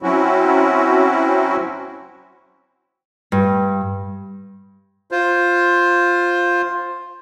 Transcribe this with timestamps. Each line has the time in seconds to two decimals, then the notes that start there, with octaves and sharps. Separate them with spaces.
0.03 F#3 C4 C#4 E4 F#4
3.32 G2
5.11 F4 C5